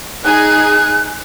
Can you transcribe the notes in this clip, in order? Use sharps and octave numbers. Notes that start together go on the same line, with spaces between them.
D#4 G#4 G#5 F#6